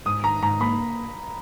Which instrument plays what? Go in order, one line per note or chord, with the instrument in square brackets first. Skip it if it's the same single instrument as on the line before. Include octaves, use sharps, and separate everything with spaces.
[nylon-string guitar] G#2 [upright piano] D#6
[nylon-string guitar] D#3 [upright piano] A#5
[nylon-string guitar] G#2 [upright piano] A#5
[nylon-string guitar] A#3 [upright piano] B5